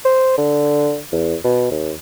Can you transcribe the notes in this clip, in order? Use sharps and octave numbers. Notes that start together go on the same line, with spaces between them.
C5
D3
E2
B2
D#2